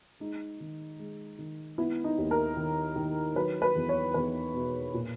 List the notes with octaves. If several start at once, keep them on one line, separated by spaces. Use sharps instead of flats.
G#3 D#4
D#3
G#3
D#3
B3 E4
D#4
D#2
A#4
D#3
D#3
F#3 B4
B4
E2
C#5
E2 B4
B2
A#2